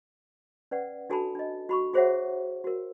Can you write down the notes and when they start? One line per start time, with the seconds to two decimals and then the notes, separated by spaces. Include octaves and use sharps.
0.71 C#4 B4 D5 F#5
1.10 D4 F#4 A4 G#5 A5 B5
1.35 D4 D#5
1.69 F#4 B5 C#6
1.93 F#4 G#4 C5 C#5 E5 F#5
2.64 F#4 A#4